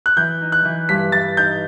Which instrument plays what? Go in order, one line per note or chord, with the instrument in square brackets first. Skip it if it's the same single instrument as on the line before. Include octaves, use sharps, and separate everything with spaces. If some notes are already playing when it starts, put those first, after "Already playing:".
[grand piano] F#6
[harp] E3 [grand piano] G6
[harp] D#4
[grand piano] F#6
[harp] E3
[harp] G2 [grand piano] B6
[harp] E3 [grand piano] A6
[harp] D#4 [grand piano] G6